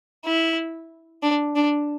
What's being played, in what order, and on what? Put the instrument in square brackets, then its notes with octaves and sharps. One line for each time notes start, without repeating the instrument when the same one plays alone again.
[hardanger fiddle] E4
D4
D4